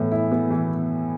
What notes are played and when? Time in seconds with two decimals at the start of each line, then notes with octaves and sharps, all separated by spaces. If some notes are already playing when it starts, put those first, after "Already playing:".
Already playing: A2 E3 B3
0.12 E4
0.32 B3
0.50 E3